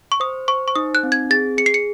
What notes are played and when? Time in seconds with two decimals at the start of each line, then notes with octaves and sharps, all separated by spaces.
0.12 C#6
0.20 C5 D#6
0.48 C5 C#6
0.68 C#6
0.76 D#4 D#6
0.95 F#6
1.03 C4
1.12 G#6
1.30 G#4 A6
1.58 G#4 C#7
1.66 C7
1.74 C#7